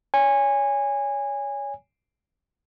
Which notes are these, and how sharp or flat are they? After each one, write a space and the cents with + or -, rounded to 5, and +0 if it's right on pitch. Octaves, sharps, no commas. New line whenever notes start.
C#5 +25 G#5 -20